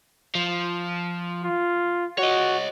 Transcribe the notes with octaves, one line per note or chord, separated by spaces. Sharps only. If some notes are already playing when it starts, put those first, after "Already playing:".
F3
F4
F#4 C#5 D#5